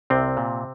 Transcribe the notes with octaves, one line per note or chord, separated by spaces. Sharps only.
C2 C3 C4
A#2